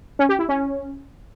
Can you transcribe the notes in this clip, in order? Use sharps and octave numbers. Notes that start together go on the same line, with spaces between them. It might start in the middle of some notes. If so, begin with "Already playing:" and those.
C#4
G4
E4
C#4